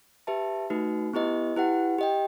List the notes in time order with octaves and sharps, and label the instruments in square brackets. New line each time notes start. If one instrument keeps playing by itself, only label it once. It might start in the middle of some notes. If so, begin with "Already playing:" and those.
[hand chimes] G4 B4 E5 A5
A3 D#4 F#4 B4
B3 E4 G4 B4 D#5
E4 G4 B4 F#5
G4 D#5 G5